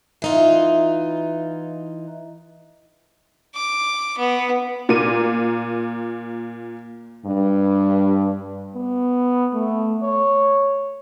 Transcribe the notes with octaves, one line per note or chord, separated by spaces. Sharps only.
E3 D#4 F4
D6
B3
A#2 A#4 D#7
G2
B3
A3
C#5